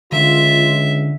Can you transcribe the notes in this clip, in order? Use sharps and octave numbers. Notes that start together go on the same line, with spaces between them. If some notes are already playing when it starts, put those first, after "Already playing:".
C#2 D3 F4 E5